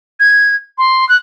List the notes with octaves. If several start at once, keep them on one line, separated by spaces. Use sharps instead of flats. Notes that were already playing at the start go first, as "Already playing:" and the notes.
G#6
C6
F#6